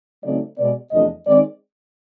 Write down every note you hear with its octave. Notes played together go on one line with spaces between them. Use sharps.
C#3 F#3 A3 C4 D#4 D5
B2 G#3 B3 D5
E2 C3 F3 A3 D4 D#5
D#3 G#3 C4 D#4 D5